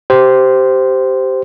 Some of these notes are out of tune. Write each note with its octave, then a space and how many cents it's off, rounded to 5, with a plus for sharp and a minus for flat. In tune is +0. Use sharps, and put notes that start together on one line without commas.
G4 -15 C5 -10